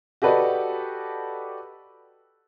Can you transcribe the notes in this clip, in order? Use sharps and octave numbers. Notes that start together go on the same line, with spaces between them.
F#4 G4 A4 B4 D5 D#5